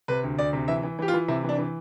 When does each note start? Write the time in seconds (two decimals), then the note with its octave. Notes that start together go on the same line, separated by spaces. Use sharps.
0.08 C3 B4
0.23 D2
0.38 D2 D5
0.53 C3
0.68 E3 E5
0.83 E3
0.99 E3 G4
1.08 F4
1.14 E3
1.28 C3 E4
1.43 E3
1.49 D4
1.58 E3